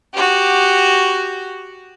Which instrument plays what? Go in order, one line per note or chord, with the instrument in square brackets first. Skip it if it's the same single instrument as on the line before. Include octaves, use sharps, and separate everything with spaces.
[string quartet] F#4 G4